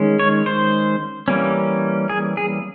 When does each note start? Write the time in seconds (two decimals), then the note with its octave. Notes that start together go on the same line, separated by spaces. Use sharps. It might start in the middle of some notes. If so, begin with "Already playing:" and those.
Already playing: D#3 G#3 C#4
0.19 C#5
0.46 C5
1.28 E3 G3 A#3 C#4
2.09 G#4
2.37 G#4